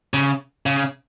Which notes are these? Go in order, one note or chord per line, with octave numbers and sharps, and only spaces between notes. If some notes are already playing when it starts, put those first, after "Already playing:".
C#3
C#3